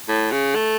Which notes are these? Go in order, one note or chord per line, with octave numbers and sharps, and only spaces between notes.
A2
C#3
A3